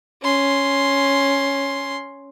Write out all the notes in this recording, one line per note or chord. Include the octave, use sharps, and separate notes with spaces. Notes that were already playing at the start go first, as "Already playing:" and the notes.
C#4 C6